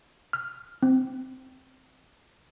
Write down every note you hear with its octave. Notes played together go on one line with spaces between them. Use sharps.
F6
C4